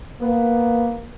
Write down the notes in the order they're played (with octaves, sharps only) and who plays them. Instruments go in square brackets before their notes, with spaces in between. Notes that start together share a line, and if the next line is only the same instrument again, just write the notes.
[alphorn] A#3 [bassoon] B3